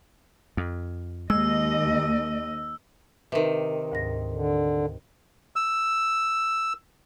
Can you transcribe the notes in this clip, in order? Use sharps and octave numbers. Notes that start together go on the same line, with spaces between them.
F2
D#2 G#3 D#5 E6
C3 D#3 B4
D2 G#2 A#6
D3
E6